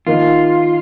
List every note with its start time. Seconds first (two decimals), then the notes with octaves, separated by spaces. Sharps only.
0.07 D#3 A#3 D#4 F4